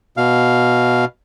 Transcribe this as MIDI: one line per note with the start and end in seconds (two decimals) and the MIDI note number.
0.17 1.05 47
0.17 1.05 77